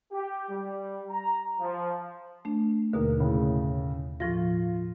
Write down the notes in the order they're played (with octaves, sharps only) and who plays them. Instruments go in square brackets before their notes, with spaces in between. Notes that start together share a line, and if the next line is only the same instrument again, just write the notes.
[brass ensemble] G4
G3
A#5
F3
[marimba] A3 D4
[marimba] D#2 B2 D3 [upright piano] A#3
[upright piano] A2 C#3
[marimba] A2 F3 A#6 [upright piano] F4